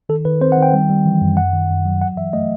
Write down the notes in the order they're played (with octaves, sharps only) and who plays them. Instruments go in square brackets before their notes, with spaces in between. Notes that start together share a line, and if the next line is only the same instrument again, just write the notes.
[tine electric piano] D#3 A4
D#3 B4
C4 C5
F#5
D#3
G5
G3
G3
E3
F#2
F#2 F#5
D#3
F#2
F#3
G2 F#5
E3 E5
A3 D#5